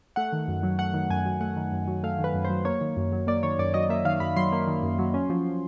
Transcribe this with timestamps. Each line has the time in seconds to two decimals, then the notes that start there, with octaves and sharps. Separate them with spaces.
0.16 A3 F#5
0.33 D#3
0.48 F#2
0.63 F#3
0.79 A3 F#5
0.94 D#3
1.10 F#2 G#5
1.25 F#3
1.41 A3 F#5
1.57 D#3
1.72 F#2
1.88 F#3
2.04 A3 F5
2.19 D#3
2.24 B4
2.34 F#2
2.44 C5
2.50 F#3
2.65 A#3 C#5
2.81 D#3
2.97 F#2
3.12 F#3
3.27 A#3 D5
3.43 D#3 C#5
3.59 F#2 D5
3.74 F#3 D#5
3.89 A#3 E5
4.05 D#3 F5
4.20 F#2 B5
4.36 F#3 C6
4.52 A#3
4.67 D#3
4.83 F#2
4.99 F#3
5.14 C#4
5.30 F3